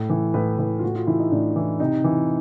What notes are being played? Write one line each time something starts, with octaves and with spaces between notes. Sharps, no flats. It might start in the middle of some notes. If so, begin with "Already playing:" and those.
Already playing: A2
E3
A2 B4
E3 B4
F4
A2 F#4
F4
E3 E4
D#4
A2 D4
E3
C3 D#4
E3